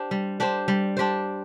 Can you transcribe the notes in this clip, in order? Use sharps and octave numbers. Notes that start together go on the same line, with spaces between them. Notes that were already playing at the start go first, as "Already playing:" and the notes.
Already playing: D4 G4 C5
G3
D4 G4 C5
G3
D4 G4 C5